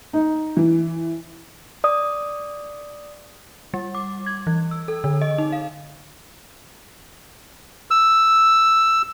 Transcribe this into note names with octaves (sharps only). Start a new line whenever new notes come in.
D#4
E3
D5 D#6
G3
D6
G#6
E3
E6
A4
D3
D#5
D#4
F5
E6